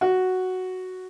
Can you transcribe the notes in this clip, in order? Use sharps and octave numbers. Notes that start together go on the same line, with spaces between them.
F#4